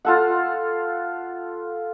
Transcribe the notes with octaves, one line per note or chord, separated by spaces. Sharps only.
F4 A4 F#5